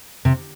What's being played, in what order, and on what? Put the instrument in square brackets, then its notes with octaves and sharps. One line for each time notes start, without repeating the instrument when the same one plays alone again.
[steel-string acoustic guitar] C3